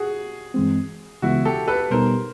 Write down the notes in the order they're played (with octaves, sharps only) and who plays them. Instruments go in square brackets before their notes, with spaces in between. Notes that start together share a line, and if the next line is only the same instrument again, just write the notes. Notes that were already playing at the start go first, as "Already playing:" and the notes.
Already playing: [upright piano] F#4 G#4
[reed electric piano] G2 E3 G#3 C4
[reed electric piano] C#2 C#3 E3 G#3 B3 [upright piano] E4 F#4
[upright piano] G4 A4
A4 B4
[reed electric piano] B2 G3 B3 D#4 G4 [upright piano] A#4 C5